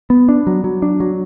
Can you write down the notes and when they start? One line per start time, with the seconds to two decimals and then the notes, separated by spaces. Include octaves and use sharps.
0.10 B3
0.29 D4
0.47 F#3
0.64 F#3
0.82 D4
1.00 F#3